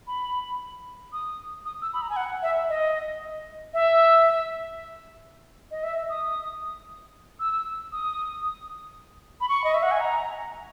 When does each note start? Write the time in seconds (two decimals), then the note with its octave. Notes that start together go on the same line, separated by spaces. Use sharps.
0.07 B5
1.13 D#6
1.65 D#6
1.82 E6
1.93 B5
2.02 A#5
2.10 G#5
2.16 F#5
2.42 E5
2.69 D#5
3.74 E5
5.71 D#5
5.83 E5
6.09 D#6
7.40 E6
7.92 D#6
9.41 B5
9.49 C#6
9.64 D#5
9.74 E5
9.83 F#5
9.91 G#5
10.01 A#5